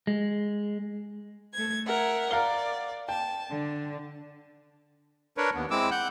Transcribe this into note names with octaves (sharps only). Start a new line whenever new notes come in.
G#3
A3 G#6
A#4 E5 F#5
A#4 D5 F5 G7
G5 A5
D3
D4 A#4 B4 C#5
D#2 B3
G#3 C4 E4 D6 E6
F#5 F#6 G6